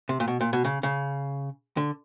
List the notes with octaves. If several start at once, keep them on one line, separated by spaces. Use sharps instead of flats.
C3
A#2
B2
A#2
B2
C#3
C#3
D3